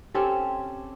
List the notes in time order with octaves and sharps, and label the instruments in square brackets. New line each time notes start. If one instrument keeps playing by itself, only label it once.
[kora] C4 C#4 G4 A4